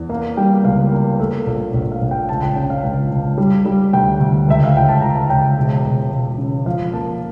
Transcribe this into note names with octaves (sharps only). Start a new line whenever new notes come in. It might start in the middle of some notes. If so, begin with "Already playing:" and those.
Already playing: E2
A#3 F5
G3 G5
C#2 F5
A#3
A3
A#1
A#1
F5
A#1
G5
C#2 A5
G5
C#3 G5
F5
C#2
C#2
G3
G3
D2 G5
D2
C#2 E5
F5
C#2 G5
A5
C#2 A#5
A5
C#2 G5
E1
E1
E1
C#3
F3 F5
A#3 A5